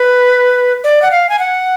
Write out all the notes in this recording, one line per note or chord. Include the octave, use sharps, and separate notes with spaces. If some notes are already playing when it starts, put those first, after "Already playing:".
Already playing: B4
D5
F#5
F5
G#5
F#5